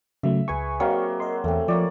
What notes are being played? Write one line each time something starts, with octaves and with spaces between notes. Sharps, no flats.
C#3 F#3 A3 E5
C#2 G#4 B4 G#5 C#6
F#3 A#3 C4 D#5 F5 C#6
A#4 D#5 C6
E2 A3 C4
F3 A#3 C#5 D5